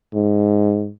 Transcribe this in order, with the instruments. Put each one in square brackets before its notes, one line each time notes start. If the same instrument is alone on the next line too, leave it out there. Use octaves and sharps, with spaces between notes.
[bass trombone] G#2